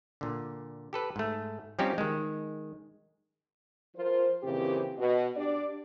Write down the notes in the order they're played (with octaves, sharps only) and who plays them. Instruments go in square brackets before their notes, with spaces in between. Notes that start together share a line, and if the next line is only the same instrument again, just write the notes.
[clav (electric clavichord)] A#2 D3
G4 A4 B4
G#2 A3
F3 G3 C4 C#4 D#4 G4
D#3 G#3
[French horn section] F3 F4 A#4 C5
F2 A#2 C#3 E3 C4 G4
B2
D4 G4 D5